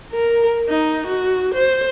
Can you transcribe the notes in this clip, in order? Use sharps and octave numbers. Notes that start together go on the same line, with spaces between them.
A#4
D#4
F#4
C5